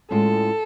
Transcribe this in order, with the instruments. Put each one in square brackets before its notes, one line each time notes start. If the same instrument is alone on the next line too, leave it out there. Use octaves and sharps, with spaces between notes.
[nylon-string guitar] A2 G#3 C#4 F4 [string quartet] A4